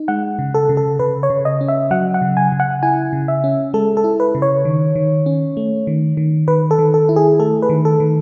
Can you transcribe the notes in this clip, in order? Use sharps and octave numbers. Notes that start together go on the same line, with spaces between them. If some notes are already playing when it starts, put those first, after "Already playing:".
Already playing: D#4
G#3 F#5
C#3
A4
C#3
A4
C#3 B4
C#5
C#3
D#5
C#4
E5
F#3 F#5
F#5
C#3
G#5
C#3
F#5
E4 G#5
C#3
E5
C#4
G#3 A4
A4
E4
B4
C#3
C#5
D#3
D#3
C#4
A3
D#3
D#3
D#3 B4
A4
D#3
A4
E4
G#4
A3 A4
B4
D#3
A4
D#3